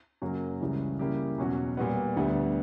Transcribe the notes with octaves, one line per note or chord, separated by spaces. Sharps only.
F#2 C#3 F#3 A#3
C#2 C#3 E3 G3 C#4
C#3 G3 A#3 E4 G4
E2 B2 F#3 C#4 F#4
A#2 G3 B3
D2 D3 G3 B3